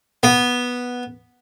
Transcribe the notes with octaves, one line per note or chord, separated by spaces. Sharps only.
B3